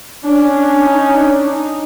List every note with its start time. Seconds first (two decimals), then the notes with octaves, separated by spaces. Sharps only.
0.24 C#4 D4
0.55 D4
0.86 D#4
1.16 D4
1.48 D#4